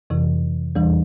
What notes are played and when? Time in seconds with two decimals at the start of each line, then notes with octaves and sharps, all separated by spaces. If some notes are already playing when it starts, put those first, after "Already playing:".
0.10 F2 C3 E3
0.75 E2 E3 G3